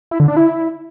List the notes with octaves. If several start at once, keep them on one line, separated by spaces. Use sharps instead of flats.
E4
D3
D4
E4